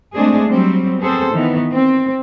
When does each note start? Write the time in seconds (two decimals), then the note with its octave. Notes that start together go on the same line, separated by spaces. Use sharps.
0.14 G#3 A3 C4 D4 G#4
0.48 F#3 G3 C4
1.00 B3 C4 G#4 A4 C5
1.34 D#3 E3 B3
1.71 C4